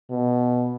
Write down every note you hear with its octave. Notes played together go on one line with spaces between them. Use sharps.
B2